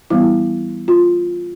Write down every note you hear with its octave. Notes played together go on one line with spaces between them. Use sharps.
E3 G3 B3 E4
F4